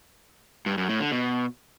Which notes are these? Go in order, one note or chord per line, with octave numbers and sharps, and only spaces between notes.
G2
F#2
A2
D3
B2